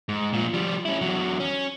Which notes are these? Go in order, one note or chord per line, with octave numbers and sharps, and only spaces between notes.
G#2
A#2 F3
F3 G3
C#4 E4
E2 F#3
C#4